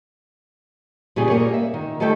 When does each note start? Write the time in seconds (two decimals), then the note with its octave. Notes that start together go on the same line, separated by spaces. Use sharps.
1.16 A#2 C#3 G3 G#4
1.30 G3 A#3 C#5
1.53 E5
1.74 D#3
2.00 D#3 G3 A3 A4 E5 G5